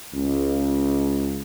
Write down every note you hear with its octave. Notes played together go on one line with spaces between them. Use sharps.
C#2